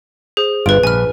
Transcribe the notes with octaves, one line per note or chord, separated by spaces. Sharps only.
G#4 C5
G1 G2 F4 B4 D7
A#1 B4 G#5 F6